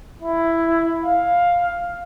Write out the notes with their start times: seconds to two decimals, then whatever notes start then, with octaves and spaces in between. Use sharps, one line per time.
0.22 E4
1.04 F5